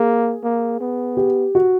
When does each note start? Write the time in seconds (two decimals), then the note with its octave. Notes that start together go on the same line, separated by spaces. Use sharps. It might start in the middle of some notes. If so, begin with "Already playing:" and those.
Already playing: A#3 G#4
0.43 A#3
0.80 B3
1.17 G4
1.55 F#4